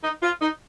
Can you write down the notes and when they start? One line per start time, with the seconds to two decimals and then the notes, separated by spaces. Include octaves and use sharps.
0.03 D#4
0.23 F4
0.42 D#4